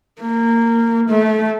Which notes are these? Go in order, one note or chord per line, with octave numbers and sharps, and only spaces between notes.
A#3
A3